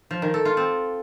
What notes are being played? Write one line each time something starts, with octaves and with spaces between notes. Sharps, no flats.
F3
D#3
A4
F4
C4